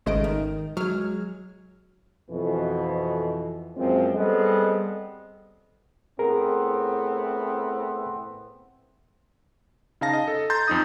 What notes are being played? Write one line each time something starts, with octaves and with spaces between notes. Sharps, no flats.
G#1 C#3 G#3 A3 D#5 D7
D#3
F#3 G#3 F6
F2 B2 E3
F#2 A#2 F3 G#3 C4
G3 B3 C4 G#4 A4 D#5
A2 B3 C4 G#4 A#4
C#3 D#4 F5 A5 A#6
D#5
A4
A#5 C6 G6 A6
F2 D#4 D#6